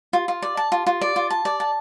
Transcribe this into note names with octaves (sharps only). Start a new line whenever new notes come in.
F4
F4
D5
A5
F4
F4
D5
F4
A5
D5
A5